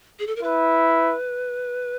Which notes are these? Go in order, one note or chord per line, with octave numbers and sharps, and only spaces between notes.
G#4
A4
A#4
E4 B4